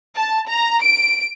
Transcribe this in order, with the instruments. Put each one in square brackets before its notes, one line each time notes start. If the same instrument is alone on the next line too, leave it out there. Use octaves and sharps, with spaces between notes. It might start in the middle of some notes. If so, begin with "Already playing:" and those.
[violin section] A5
A#5
D7